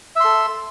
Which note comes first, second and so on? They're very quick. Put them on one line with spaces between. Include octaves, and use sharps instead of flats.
E5 C6 A4